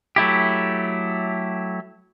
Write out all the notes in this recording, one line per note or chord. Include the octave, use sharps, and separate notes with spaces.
F#3 A3 E4 G4